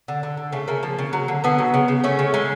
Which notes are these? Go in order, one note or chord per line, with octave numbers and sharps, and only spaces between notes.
D3
D3
D3
C#3 A3
C#3 A#3
F3
C#3
F#3
D3
D3 B3
F#3
C#3
C#3
A3 C#4
C#3
G#3